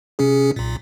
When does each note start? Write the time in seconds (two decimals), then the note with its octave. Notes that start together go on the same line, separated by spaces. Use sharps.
0.19 C3 C#4 G#4
0.56 B1 A#2